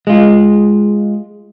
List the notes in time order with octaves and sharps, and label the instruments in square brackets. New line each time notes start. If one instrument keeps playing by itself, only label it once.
[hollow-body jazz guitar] G#3 F4